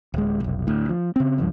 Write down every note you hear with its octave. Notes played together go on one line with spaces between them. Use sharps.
D1 G#3
F1 B1
D2 A2
F3
C#3 C4
D1 C#2 G2 F3